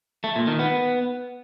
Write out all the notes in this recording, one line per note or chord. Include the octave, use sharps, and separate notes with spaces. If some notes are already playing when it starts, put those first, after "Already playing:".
A3
A#2
D#3
B3